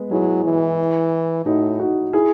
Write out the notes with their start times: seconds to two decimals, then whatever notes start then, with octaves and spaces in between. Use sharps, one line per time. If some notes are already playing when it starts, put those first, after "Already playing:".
Already playing: G#3 B3
0.11 F#3 E4 G#4
0.45 E3
1.45 A2 D#4 F#4
1.79 D#4 F#4
2.13 E4 G#4